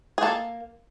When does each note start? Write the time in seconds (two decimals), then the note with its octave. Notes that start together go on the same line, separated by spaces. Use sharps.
0.18 G#4
0.22 A#3 A4